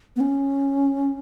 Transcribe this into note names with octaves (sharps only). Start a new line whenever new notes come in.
B3
C#4